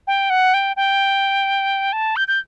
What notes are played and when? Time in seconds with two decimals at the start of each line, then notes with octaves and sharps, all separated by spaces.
0.07 G5
0.30 F#5
0.54 G5
0.76 G5
1.93 A5
2.16 G6
2.28 G6